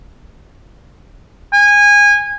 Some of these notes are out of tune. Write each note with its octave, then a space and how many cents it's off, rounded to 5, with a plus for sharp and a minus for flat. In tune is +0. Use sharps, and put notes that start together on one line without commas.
G#5 -20